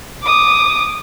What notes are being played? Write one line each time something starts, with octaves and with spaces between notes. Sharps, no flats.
D6 D#6